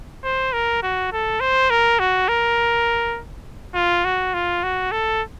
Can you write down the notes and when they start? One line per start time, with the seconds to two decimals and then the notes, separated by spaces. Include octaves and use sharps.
0.24 C5
0.53 A#4
0.83 F#4
1.12 A4
1.40 C5
1.70 A#4
1.99 F#4
2.28 A#4
3.74 F4
4.05 F#4
4.34 F4
4.63 F#4
4.91 A4